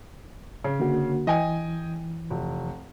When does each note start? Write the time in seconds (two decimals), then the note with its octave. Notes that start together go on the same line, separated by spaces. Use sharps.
0.64 C#3
0.80 D3 A#3 F#4
1.27 E3 D#5 G5 G#5
2.30 F1